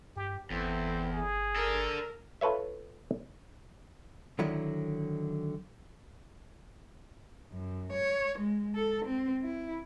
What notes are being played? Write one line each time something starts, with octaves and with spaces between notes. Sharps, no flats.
G2 G4
G1 E2 C4 E4 A4
G#4
D4 A4 A#4
F4 A4 B4 C#5 E5
D3 D#3 F#3 E4
F#2
C#5
G#3
A4
C4
E4